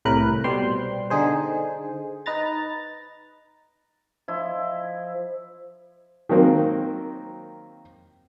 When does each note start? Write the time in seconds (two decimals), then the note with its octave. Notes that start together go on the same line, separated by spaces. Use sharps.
0.05 C2 A2 A#4 B4 F#6
0.44 B2 G3 C5 G5 C6
1.10 D3 D#4 G#4 C5
2.26 D#4 B4 A#5 A6
4.28 F3 E4 D#5
6.29 D#3 F#3 A#3 C4